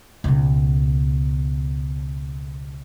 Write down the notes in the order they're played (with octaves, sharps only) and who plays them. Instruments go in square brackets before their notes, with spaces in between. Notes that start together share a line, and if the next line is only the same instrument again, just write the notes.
[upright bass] C#2 B2